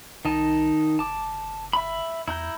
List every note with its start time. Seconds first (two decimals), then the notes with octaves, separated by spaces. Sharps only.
0.25 C2 D#3 D#4 A5
0.99 F#1 A5 D6
1.73 E5 B5
2.28 E2 E4 A#5 G6